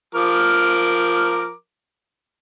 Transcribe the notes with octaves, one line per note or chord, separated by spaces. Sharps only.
F3 A#4 D6